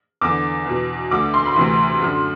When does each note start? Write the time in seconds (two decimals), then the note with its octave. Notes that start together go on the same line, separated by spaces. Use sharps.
0.21 E2 D3 D6
0.66 E2 B2
1.11 D2 D3 D6
1.34 C6
1.46 B5
1.56 D2 C3 E3 C6
2.02 F#2 D3